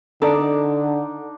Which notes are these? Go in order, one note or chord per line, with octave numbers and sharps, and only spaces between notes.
D3 D4 D#4 A4 D5